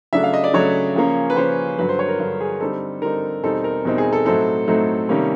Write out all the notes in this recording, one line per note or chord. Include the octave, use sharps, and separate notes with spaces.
C#3 F#3 A3 D4 E5
F5
D#5
D5
C#3 F#3 A3 D4 C#5
C#3 F3 A#3 C#4
B4
C#3 F3 A#3 C#4 C5
G2 D3 F#3 B4
C5
C#5
A#4
G2 D3 F#3
G#4
D3 G3 C4 D#4 A4
D3 G3 C4 D#4 A#4
E2 B2 G3 C4 D#4 A4
A#4
E2 B2 G3 C4 D#4
G#4
A4
A2 F#3 A3 C4 D#4 A4
A2 F#3 A3 C4 D#4
C3 D#3 G3 A#3 C#4